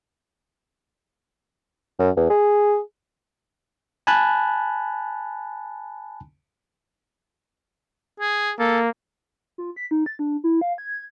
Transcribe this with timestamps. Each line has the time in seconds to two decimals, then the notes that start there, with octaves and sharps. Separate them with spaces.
1.99 F#2
2.16 E2
2.30 G#4
4.07 G#5 A5 B5 F#6
8.20 G#4
8.59 A#3 A4
9.58 F4
9.76 B6
9.91 D#4
10.06 A6
10.19 D4
10.44 E4
10.61 F5
10.78 G#6